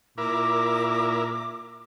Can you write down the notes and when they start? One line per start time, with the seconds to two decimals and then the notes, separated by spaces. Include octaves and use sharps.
0.18 A#2 E4 A#4 D6